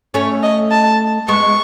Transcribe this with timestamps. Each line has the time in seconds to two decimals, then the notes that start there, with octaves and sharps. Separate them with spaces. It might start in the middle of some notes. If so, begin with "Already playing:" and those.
0.14 A3 C#4 C#5
0.43 D#5
0.71 A5
1.28 G#3 B3 C#6